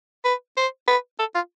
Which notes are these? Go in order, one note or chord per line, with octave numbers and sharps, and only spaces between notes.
B4
C5
B4
A4
F4